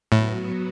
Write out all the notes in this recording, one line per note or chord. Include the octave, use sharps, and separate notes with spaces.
A2 F#3 B3 F#4